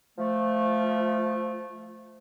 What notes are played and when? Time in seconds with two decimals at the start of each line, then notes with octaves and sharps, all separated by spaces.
0.18 F3 A3